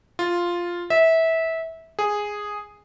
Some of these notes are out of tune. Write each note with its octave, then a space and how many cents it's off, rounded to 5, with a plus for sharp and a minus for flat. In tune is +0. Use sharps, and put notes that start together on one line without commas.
F4 +0
E5 -20
G#4 -5